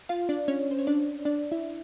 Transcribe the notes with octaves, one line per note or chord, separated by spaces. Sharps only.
F4 F5
D4 D5
C#4 C#5
C5
C#5
D4 D5
D4 D5
E4 E5